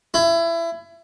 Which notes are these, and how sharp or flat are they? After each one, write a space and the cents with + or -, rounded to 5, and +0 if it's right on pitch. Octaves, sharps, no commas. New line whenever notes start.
E4 +25